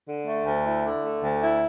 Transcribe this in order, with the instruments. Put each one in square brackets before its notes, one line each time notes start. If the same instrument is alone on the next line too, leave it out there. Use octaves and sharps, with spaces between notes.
[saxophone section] D3
A3
D2
E4
D3
A3
D2
E4